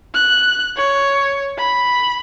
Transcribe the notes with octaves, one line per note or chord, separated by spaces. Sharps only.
F#6
C#5
B5